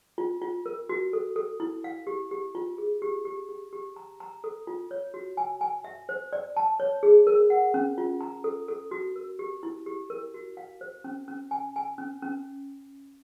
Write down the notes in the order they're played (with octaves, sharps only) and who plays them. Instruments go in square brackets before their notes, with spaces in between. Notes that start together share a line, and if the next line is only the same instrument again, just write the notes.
[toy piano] F4
F4
A#4
F#4
A4
A4
E4
F5
G4
G4
F4
G#4
G4
G4
G4
G4
A#5
A#5
A4
F4
C#5
F#4
G#5
G#5
E5
C5
D5
A5
C#5
G#4
A#4
F#5
C#4
F4
A#5
A4
A4
F#4
A#4
G4
E4
G4
A#4
F#4
F5
C5
C#4
C#4
G#5
G#5
C#4
C#4